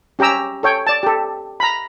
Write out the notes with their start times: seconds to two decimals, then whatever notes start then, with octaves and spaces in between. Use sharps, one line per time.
0.19 C#4 G4 G5 A#5 E6
0.63 A4 C#5 G5
0.87 D5 A5
1.03 G4 A4
1.60 A#5 B5